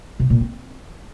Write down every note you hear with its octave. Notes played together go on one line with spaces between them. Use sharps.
C3
A#2
C4